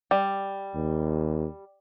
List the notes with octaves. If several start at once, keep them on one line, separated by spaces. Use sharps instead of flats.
G3
D#2